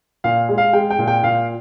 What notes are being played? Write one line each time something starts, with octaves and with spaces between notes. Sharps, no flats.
A#2 F5
G#3
F5
G#3 G5
G5
A#2
G5
A#2 F5